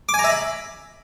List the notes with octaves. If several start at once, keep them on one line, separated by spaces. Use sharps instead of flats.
D6
G#5
A#5
E5
B5